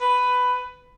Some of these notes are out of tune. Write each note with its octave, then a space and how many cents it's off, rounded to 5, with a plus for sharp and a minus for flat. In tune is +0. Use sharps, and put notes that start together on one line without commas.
B4 +10